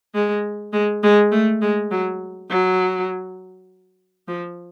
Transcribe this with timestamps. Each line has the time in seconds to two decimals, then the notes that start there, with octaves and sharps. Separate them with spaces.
0.14 G#3
0.73 G#3
1.03 G#3
1.32 A3
1.61 G#3
1.91 F#3
2.50 F#3
4.28 F3